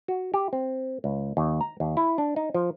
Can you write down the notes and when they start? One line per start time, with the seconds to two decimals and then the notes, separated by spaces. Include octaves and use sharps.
0.08 F#4
0.34 G4
0.53 C4
1.04 C#2
1.37 D#2
1.61 A#5
1.80 D#2
1.97 E4
2.18 D4
2.36 D#4
2.54 F3